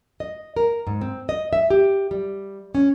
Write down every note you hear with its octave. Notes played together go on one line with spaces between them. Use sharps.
D#5
A#4
G#2
C4
D#5
E5
G4
G3
C#4